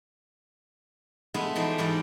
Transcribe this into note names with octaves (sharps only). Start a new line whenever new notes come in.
G#3 A3 B3 E4 F4 G#4
E3 F3 D#4 A4 C5 D5
E2 G#2 G3 G4 D5